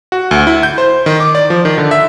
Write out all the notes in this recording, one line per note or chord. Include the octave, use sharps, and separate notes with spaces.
F#4
D2
E4
G6
C5
D#3
D6
D5
F3
D#3
D3
E5